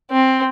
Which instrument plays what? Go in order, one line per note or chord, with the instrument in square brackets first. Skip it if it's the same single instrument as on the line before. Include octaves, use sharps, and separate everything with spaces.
[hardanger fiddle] C4